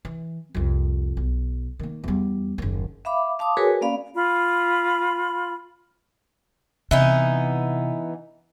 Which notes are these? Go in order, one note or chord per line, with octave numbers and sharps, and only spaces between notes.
E3
C2 F2
B1
D#3 A#3
E2 G3
F#1 D#2
E5 F5 B5 D6
F5 A5 C6 D6 D#6
F#4 G#4 A#4 B4 C#5 G#5
A#3 C#4 D5 F5 B5
F4 B5
C3 E3 B3 D#4